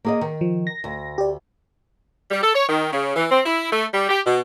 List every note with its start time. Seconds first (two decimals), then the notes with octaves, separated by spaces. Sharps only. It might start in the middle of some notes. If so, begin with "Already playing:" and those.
0.05 A#3 G#4 D#5
0.21 D#3
0.41 F3
0.67 A#6
0.84 D2
1.18 G4 D5
2.31 G3
2.42 A4
2.55 C#5
2.69 D#3
2.93 C#3
3.16 E3
3.31 C4
3.46 E4
3.73 A3
3.93 G3
4.09 G4
4.26 B2